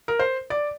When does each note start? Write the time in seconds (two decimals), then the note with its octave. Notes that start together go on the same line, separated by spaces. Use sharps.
0.08 A#4
0.19 C5
0.50 D5